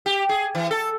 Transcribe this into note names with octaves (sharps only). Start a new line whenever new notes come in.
G4
G#4
E3
A4